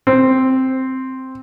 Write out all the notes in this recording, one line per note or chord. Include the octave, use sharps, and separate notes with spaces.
C4